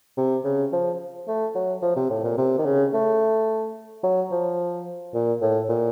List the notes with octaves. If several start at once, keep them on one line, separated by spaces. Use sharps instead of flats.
C3
C#3
F3
A3
F#3
F3
C3
A2
A#2
C3
D#3
C#3
A3
F#3
F3
A#2
A2
A#2